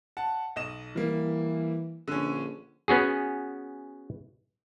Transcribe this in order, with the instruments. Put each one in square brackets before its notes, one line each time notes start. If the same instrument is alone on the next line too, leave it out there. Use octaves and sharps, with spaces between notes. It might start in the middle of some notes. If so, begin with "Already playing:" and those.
[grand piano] F#5 A5
B1 D#5 E7
[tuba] E3 [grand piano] G3 A#3
[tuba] A#1 [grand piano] D3 C#4
[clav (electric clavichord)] B3 C#4 F#4 G#4